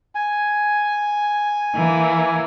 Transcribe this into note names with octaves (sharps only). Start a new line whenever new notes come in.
G#5
E3 A#3